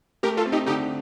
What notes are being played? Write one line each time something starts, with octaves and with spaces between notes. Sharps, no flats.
A3 G4 A#4
F4 A4
C4
D#4 G4
D3 D#4 G4